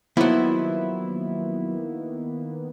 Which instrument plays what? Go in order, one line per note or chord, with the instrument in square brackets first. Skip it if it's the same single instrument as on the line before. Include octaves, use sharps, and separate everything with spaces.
[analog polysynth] D#3 A#3 B3 [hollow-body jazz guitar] F3 F#3 [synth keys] E4